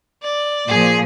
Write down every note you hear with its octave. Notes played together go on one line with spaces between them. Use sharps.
D5
A#2 F3 G#4